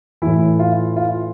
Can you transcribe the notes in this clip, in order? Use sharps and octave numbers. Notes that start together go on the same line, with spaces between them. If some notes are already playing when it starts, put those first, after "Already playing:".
A2 E3 E4
F4
F4